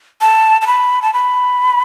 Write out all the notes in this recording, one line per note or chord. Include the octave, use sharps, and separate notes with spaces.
A5
A5
B5
A5
B5